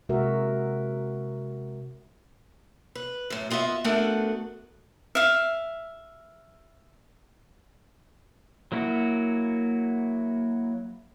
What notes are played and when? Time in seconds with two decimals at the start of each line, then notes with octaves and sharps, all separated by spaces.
0.09 C3 G#3 F#4 A#4 E5
2.95 B4
3.30 F#2 A2
3.51 B3 F4 D#5 E5
3.84 A3 B3 D4 F#4 A4 A#4
5.15 E5 F5
8.72 F#3 A#3 E4 F#4